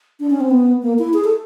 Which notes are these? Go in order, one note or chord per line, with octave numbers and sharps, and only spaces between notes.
D4
C#4
C4
B3
A#3
E4
G#4
A4